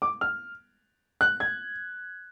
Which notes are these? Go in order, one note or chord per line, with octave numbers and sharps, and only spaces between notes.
D6
F6
F#6
G#6